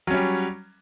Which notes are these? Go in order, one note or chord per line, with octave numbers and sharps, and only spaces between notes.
F#3 G3 C#4